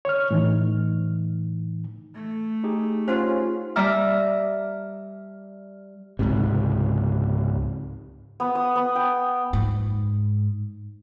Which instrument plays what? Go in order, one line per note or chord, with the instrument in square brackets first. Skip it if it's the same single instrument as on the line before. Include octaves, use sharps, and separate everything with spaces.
[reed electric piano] C#5 F6
A2 E3 D#4
[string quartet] A3
[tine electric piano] D#4 G4 G#4
[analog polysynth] C#4 F4 [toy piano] C5 F#5
[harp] G3 E5 A5 A#5 D6 F6
[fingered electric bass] C#2 G#2 C3
[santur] B3
D#6
B3
G5
[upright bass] G#2